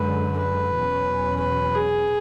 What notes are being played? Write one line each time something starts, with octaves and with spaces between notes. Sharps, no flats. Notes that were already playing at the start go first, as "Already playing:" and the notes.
Already playing: F#2 D3 G#3 B4
B4
E2 B2 F#3 C#4
B4
G#4